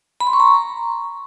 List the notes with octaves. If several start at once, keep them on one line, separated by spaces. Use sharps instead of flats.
B5
C6
C#6
A#5